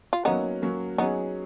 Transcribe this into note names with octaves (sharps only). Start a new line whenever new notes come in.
F4
F#3 A#3 B3 C#4 D#4
F#3 A#3 C#4
F#3 B3 C#4 D#4 G#4